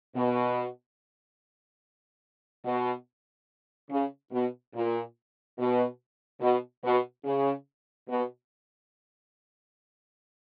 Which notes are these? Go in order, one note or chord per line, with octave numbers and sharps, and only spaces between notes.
B2
B2
C#3
B2
A#2
B2
B2
B2
C#3
B2